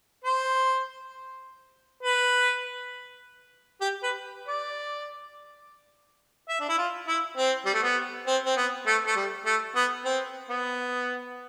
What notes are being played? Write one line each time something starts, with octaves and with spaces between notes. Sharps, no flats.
C5
B4
G4
B4
D5
E5
D4
E4
F4
E4
C4
G3
A3
B3
C4
C4
B3
A3
A3
G3
A3
B3
C4
B3